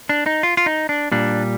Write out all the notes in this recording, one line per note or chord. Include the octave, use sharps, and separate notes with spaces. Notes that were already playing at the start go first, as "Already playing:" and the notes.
D4
D#4
F4
F4
D#4
D4
A#2 G3 D4